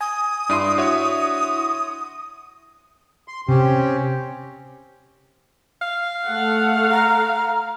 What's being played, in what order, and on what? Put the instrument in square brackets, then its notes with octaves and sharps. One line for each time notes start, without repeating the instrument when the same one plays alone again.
[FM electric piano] G#5 [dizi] D#6
[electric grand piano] G2 D#7 [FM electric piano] D4 E4 C6
[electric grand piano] F#4 C#5 E5
[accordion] C6
[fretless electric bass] C3 [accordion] C4 C#4 G4
[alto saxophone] F5
[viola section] A3 A4 F#5
[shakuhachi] A#5